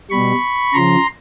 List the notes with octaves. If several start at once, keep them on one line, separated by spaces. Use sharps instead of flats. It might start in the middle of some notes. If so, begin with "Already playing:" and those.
B2 G3 B5 C#6
C#3 F3 A#5 C6